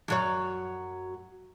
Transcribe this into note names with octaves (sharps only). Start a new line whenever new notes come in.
F#2 F#3 C#5